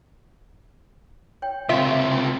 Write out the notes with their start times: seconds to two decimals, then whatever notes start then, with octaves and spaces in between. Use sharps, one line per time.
1.42 C#5 G5
1.69 C#2 C3 F4 E5 F5 G5 C#6